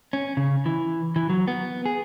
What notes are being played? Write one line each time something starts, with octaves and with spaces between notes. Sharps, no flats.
C#4
C#3
E3
E3
F#3
B3
G#4